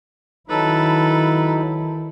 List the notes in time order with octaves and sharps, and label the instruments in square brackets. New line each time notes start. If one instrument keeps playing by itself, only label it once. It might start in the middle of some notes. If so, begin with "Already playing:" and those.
[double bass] D#3 E4 [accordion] F#3 D#4 [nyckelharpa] A4 B4